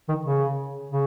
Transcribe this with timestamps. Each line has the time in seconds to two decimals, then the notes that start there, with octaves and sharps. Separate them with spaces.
0.08 D#3
0.25 C#3
0.90 C#3